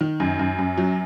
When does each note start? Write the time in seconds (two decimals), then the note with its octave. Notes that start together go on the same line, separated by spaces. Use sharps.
0.01 D#3
0.20 F#2
0.39 F#2
0.59 F#2
0.78 F#3